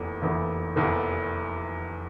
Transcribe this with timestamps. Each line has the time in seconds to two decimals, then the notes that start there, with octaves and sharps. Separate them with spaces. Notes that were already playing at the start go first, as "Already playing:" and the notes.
Already playing: F1 E2 E3 A#3
0.22 F1 E2 E3 A#3
0.76 F1 E2 E3 A#3